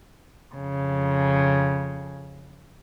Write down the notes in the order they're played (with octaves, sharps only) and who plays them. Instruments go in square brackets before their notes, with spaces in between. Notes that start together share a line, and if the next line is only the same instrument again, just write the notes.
[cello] F2 C#3